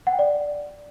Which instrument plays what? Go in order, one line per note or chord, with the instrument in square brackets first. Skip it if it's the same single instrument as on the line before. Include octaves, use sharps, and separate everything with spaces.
[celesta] F#5
G5
D5